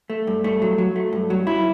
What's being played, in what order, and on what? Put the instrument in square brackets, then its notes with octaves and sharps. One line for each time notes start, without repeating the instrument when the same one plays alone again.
[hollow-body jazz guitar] A3
G2
A3
F#3
F#3
A3
G2
F#3
E4